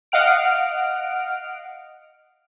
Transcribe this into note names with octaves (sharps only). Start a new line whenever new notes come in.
D#5 F5 F#5 F6 D7